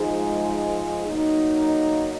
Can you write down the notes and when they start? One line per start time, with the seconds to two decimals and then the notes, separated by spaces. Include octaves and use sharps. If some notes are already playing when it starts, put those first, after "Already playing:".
Already playing: G#2 F3 G#3 D#4 G#4
1.07 F#3 A#3 D#4